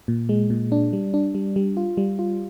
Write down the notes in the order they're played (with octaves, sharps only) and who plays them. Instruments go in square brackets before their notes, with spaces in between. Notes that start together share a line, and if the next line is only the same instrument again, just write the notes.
[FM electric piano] A#2
G#3
A#2
D4
G3
D4
G3
G3
F4
G3
F4